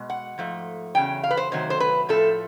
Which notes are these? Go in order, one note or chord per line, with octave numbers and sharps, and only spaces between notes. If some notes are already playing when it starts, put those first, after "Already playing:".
Already playing: B2 G#3
F#5
G#2 F3 A3
E2 C#3 F#3 G5
F5
B4
C5
C3 D#3 F#3 A3 C5
C5
B4
A2 F3 A3 A4